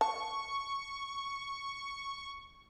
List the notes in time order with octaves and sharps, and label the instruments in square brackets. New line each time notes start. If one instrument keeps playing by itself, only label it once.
[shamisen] A5 [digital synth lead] C#6